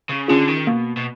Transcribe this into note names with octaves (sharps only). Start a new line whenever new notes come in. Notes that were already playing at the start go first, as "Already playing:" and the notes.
C#3
D3 C#4 F4 G#4
D#3
B2 A#3
B2